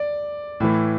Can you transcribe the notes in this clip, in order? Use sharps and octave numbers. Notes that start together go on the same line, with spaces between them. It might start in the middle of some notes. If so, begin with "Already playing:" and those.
Already playing: D5
A2 E3